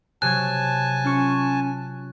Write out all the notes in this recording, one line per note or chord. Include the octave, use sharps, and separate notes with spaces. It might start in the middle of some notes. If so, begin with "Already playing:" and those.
C3 F#3 G#5 A5 F#6 G#6
C#4 F4 C#6